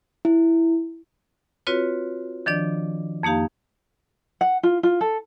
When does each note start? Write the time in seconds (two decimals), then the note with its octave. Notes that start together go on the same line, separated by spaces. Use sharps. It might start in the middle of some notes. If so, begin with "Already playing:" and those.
0.25 E4
1.67 C4 F4 F#4 B4 C#5
2.46 D#3 F3 D4 D5
3.23 F2 A#3 D#4 G4 F5
4.41 F#5
4.63 F4
4.83 F4
5.01 A4